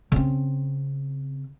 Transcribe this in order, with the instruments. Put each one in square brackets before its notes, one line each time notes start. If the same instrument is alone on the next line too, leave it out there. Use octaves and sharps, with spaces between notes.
[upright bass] C#3 C4